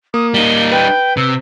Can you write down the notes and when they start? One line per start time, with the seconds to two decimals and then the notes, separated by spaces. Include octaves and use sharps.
0.14 A#3 D#6
0.34 G3 D#4 G7
0.72 B4 G5
1.17 C3 E6